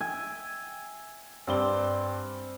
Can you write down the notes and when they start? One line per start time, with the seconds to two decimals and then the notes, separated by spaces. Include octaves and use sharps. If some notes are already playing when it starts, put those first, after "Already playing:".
0.01 E5 G5 G#5
1.47 G2 C4 D5 G7